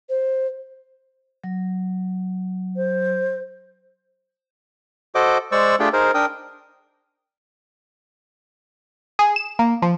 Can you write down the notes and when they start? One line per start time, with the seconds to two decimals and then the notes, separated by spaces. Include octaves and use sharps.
0.09 C5
1.44 F#3
2.76 C5
5.15 F#4 A4 C5 D#5 D6
5.52 G#3 C5 D5 C#6 E6
5.80 A3 D4 F4 G4 G#4 G5
5.93 D#4 G#4 A#4 C5
6.14 D4 A#4 G5 D#6
9.19 G#4
9.36 E7
9.59 A#3
9.82 F3